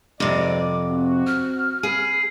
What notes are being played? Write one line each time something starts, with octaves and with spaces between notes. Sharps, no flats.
G#1 F2 C3 D5 D6
C4 F#4
F6
G#4 B4